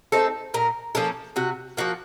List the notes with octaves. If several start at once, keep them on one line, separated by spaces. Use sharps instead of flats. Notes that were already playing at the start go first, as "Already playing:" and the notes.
A3 C4 D#4 A4
A#2 A#4
F3 A#3 C#4 A4
C3 F#4
F3 A#3 F#4